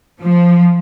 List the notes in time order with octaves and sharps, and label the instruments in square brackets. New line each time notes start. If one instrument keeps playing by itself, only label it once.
[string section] F3